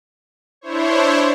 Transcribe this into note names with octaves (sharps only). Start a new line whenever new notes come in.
D4 E4 C5 C#5